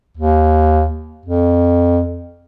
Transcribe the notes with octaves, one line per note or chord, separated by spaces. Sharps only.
D#2
F2